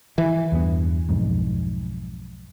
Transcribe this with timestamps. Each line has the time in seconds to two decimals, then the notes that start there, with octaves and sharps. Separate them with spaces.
0.18 E3
0.52 E2 G2 B3
1.09 B1 F2 G#2